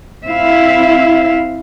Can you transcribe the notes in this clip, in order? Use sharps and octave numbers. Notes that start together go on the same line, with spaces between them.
C4 E4 E5 F5